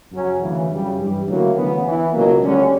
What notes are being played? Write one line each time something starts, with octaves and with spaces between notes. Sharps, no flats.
F#2 C#3 F#3 C#4
D2 C#3 E3
F#2 C#3 G3
G2 E3 G3
D2 C#3 F#3 A#3 E4
D2 C#3 E3 B3
E3 B3 E4
C#2 B2 F#3 A#3
D2 D3 G3 C#4